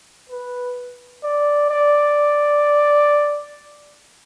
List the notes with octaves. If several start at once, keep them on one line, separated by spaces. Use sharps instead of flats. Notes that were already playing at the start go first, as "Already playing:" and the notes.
B4
D5
D5